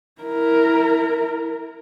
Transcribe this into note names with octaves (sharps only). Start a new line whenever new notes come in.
E4 A#4